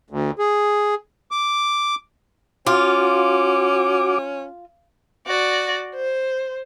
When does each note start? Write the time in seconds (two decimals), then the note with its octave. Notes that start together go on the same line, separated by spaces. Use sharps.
0.10 D2
0.39 G#4
1.31 D6
2.67 C#4 F4 F#4 D6
5.27 F#4 D5
5.95 C5